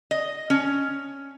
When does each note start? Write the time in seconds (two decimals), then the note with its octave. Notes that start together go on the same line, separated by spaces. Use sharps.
0.11 D#5
0.50 C#4